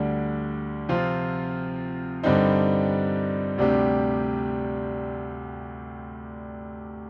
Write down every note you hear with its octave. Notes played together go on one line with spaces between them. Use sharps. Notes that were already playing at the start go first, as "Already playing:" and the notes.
Already playing: D2 D3 G3
C3 F3 C4 F4
G2 D3 G3 C4 D#4
D2 C3 G3 D4 G4